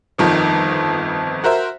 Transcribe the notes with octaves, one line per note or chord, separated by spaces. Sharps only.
G1 F2 D#3 F3
F#4 A#4 C5 E5